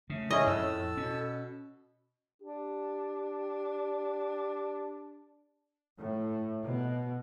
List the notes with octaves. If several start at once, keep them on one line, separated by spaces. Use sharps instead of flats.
C#3 A3
A2 C#4 E4 G#4 D#5
F2 A4 E6
B2 C#4
D4 G4
A2
B2